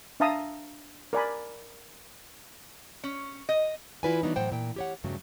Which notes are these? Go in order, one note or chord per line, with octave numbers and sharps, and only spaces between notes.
D4 E5 F5 A5 A#5 D#6
A#4 D5 G#5 B5
C#4
D#5
E3 E4 F4 B4 D5 G#5
E3 F#3 B3 D4 D#4
A2 F#3 C5 F#5 G5
A#2 G5
G4 C#5 F#5
E2 G2 C#3 F#3 A3